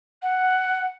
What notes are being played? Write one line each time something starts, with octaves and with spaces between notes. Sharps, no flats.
F#5